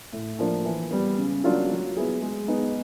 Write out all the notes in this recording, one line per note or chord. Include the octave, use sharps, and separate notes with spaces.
A2
F3 A#3 D4
E3
G3 B3
C#3
F#3 A#3 D4 F4
F#3
B3 E4 G#4
G#3
B3 D#4 G#4